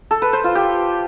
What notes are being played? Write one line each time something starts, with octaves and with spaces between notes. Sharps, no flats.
A4
B4
C5
F4
G4